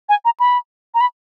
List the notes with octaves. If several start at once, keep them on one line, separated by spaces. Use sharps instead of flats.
G#5
A#5
B5
A#5
B5